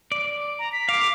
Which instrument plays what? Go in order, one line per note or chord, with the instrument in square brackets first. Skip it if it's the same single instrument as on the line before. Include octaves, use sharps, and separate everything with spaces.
[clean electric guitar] D5
[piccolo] A#5
B6
[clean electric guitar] F5 [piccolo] D6